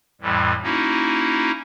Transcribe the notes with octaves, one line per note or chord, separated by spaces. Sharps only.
F2 A2 E3 G3
A#3 C#4 D#4 E4 F#4